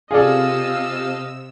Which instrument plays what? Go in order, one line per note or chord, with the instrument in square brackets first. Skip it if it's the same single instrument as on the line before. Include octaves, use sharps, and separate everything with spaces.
[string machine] C3 E6 [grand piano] F4 A4 [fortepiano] G#4 D5 [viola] D#5 F5